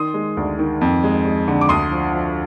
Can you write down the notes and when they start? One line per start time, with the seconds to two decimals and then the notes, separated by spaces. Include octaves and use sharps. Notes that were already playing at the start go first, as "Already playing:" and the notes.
Already playing: D#3 C6 D#6
0.14 G#3
0.37 D2
0.59 D#3
0.81 F2
1.04 G#3
1.26 G#3
1.48 D3
1.61 D6
1.69 D2 C6 D#6
1.91 F3
2.13 F3